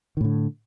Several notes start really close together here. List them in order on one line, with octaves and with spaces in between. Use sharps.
D#3 A2 D3